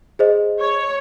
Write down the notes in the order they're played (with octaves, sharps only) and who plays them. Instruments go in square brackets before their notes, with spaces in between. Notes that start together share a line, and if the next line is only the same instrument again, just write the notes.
[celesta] G#4 C5 D#5
[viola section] C#5